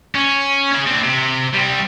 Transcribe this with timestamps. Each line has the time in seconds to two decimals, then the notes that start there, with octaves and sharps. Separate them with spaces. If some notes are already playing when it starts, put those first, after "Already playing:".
0.15 C#4
0.72 C#4 G#4
0.87 C4 D4
1.04 C3
1.54 G3 C4